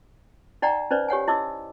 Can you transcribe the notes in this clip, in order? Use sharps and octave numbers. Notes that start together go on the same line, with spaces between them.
D#4 D5 F#5 G5 A#5
C#4 D#4 B4 C5 D5
G4 C#5 F#5 G#5
E4 D#5 D6 E6